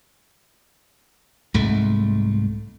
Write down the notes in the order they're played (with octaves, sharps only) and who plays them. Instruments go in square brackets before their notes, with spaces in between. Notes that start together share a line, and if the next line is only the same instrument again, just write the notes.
[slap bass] C2 G#2 A3